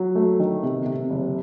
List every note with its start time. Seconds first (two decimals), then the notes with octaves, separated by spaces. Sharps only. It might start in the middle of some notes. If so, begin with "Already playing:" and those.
Already playing: F#3
0.15 A3
0.39 D#3
0.63 C3
0.86 C3
1.10 F#1